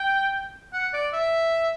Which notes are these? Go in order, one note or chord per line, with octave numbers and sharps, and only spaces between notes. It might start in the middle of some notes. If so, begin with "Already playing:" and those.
Already playing: G5
F#5
D5
E5